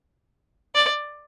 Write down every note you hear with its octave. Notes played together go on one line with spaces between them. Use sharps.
D5